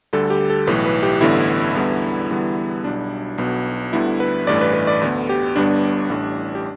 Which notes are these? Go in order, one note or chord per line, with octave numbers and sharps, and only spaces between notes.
D2 D3 G3 A4
G4
A4
B1 A2 E3 A3 B4
B4
G4
A1 G2 D3 B3 E4
E2 D3 G3 B3
E2 D3 G3 B3
B1 B2 G3 D4
B1 B2 B3
D2 D3 G3 B3 E4
B4
A1 G2 E3 A3 D5
B4
B4
D5
D2 D3 B3
G4
G1 G2 G3 B3 D4
A1 A2 G3
G4